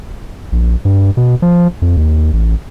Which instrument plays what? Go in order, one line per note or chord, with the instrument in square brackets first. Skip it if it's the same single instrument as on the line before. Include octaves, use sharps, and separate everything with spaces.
[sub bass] A#1
G2
B2
F3
F2
D#2
A1